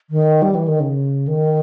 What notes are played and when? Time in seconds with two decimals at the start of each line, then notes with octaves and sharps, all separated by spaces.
0.10 D#3
0.42 G3
0.55 E3
0.68 D#3
0.80 C#3
1.27 D#3